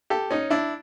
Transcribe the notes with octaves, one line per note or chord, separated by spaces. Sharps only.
G4 A4
C#4 D#4
D4 E4